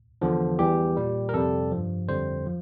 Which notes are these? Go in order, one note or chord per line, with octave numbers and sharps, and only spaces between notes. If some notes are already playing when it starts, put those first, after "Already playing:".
E2 D3 F3
E2 E3 G3 G4
A#2 G3
A#4
F2 C3 G3 A4
G2 F3
F2 D3 G3 C5
F3